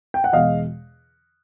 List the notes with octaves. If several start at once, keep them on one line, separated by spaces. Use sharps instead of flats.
G5
F#5
E2 B2 G#3 D#5 F5